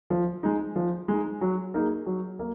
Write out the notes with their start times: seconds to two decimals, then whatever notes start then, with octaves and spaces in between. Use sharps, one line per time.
0.10 F3
0.43 G#3 D#4
0.76 F3
1.08 G#3
1.13 D#4
1.41 F#3
1.74 A#3 D#4 G#4
2.06 F#3
2.39 A#3